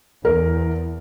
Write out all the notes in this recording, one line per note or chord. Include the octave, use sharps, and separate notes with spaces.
E2 A#4